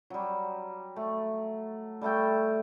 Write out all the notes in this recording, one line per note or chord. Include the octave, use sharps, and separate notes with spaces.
F#3 G3
A3
G3 A3 A4 G5